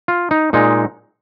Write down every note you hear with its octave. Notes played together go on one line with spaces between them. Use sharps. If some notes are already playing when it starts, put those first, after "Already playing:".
F4
D#4
A#2 G#3 D#4